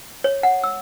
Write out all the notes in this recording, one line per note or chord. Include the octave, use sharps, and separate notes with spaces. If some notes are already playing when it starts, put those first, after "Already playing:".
C#5
F#5
E6